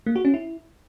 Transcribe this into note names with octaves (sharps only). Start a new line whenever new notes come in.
A#3
F#4
C#4
E4